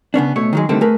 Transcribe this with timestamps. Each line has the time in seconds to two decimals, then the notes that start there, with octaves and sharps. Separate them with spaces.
0.14 C#3 B3 C#4 D4
0.36 B2 A3 C#5
0.53 D#3 F#3 G#3
0.69 D3 D#3 G3 A3 C4
0.81 A3 G#4 A#4 B4